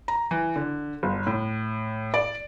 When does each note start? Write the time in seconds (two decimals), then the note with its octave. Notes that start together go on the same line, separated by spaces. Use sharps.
0.08 A#5
0.31 E3
0.56 D3
1.03 G1
1.27 A2
2.14 D5